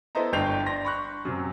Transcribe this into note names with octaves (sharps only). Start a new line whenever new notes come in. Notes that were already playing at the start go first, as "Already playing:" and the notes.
B3 E4 A4 C5 D#5 A#5
G1 G2 G5 G6 C7 F7
D4 C6 A#6
B5 C#6 F#6
F#2 C3